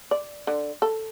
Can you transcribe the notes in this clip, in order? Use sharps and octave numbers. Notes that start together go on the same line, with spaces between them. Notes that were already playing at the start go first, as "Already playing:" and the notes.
D5
D3
A4